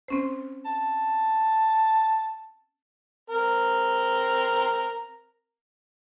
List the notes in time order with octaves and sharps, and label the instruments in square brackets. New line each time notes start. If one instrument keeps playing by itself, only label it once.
[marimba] C4 C#4 C5
[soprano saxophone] A5
[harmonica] C4 A#4 A#5